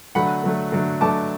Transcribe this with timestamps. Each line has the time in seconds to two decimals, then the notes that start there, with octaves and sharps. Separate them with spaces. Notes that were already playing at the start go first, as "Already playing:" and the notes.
0.15 D3 F#3 A3 F#5 B5
0.43 D3 F#3 A3
0.72 D3 F#3 A3
1.01 D3 F#3 A3 A5 D6